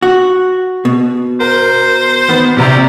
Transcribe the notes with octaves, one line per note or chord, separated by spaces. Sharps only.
F#4
B2
A#4 C5
D#3 B3
A#1 C3 G4 A#5